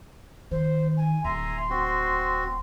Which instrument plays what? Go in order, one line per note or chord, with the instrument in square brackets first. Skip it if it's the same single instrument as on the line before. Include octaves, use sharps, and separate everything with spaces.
[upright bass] D#3 [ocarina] C5
[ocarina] G#5
[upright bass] D1 [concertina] E5 G#5 A#5 [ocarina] C6
[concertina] C4 F#4